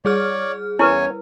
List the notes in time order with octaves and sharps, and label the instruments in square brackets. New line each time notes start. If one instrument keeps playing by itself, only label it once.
[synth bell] G3 G#4 F6 [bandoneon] C#5 D5
[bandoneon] E2 C#5 G#5 [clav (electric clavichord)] C#4 [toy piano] E4 A#4 B4